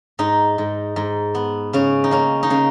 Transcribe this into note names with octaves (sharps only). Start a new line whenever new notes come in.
G#2 D#4
G#2
G#2
B3
C#3 C#4
D#4
A#3 C#4
D#4
C#3 C#4